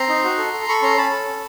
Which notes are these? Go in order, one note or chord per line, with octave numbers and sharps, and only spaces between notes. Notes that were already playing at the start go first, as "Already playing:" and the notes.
Already playing: C4 A#5 C6
D#4
F#4
A4
A4
A4 B5 C#6
C#4 A#5 C6
C#4 A5 B5
A4
C#4